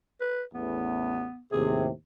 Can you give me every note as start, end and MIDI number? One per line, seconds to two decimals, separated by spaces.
0.21 0.43 71
0.54 1.25 33
0.54 1.25 40
0.54 1.41 59
1.52 1.89 39
1.52 1.89 45
1.52 1.89 48
1.52 1.86 68